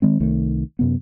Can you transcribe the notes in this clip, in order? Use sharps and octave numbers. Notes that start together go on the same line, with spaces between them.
D#3 G#3 C4
C2 D#3 A3
F#2 C3 B3